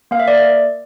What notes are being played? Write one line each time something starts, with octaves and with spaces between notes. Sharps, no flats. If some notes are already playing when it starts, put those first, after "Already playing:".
A#3 F5
E5
A#3 D5